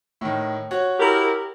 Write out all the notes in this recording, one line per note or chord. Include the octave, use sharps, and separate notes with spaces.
A2 D#3
F#4 C#5
E4 G4 A#4